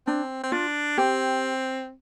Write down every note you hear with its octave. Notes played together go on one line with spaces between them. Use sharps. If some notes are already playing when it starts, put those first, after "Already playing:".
C4 D4
C4
D4 F4
C4 G4